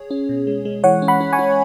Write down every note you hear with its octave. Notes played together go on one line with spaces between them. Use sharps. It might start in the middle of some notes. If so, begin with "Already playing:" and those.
Already playing: G#4 C#5
C#4
B2
G#3
G#3
E3 C#5 F#5
C#4
F#5 B5
C#4
G#5 C#6
C#4